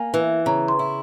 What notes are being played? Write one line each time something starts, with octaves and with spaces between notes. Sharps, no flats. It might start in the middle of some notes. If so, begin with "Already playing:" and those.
Already playing: A#3 G#5
E3
C#3 A#5
C6
E4